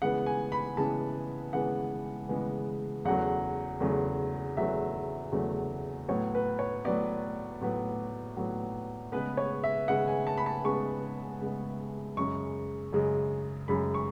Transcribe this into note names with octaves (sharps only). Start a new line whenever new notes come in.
C#3 E3 G#3 B3 F#5
G#5
B5
C#3 E3 G#3 B3 A5
C#3 E3 G#3 B3 F#5
C#3 E3 G#3 B3
E2 C#3 F#3 A3 F#5
E2 C#3 F#3 A3
E2 C#3 F#3 A3 E5
E2 C#3 F#3 A3
A2 F#3 B3 C#5
B4
C#5
A2 F#3 B3 D5
A2 F#3 B3
A2 F#3 B3
C#3 G#3 B3 B4
C#5
E5
C#3 G#3 B3 F#5
G#5
A5
B5
A5
C#3 G#3 B3 C#6
C#3 G#3 B3
F#2 C#3 G#3 C#6
F#2 C#3 G#3
F#2 C#3 G#3 B5
C#6